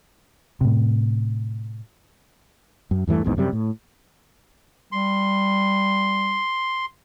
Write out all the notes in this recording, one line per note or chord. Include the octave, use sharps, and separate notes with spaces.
A2 C3
F#2
E2 G2 E3 A3
A#1 E2 G#2 D#3
F#2 C3 G3
A2
G3 C6